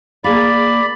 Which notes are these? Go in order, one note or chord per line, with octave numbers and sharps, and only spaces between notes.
A#3 G#4 D5 F5 B5